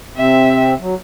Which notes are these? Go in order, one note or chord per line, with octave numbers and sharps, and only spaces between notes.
C3 C4 E5
F#3